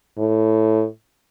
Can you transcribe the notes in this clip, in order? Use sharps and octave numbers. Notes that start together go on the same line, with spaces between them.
A2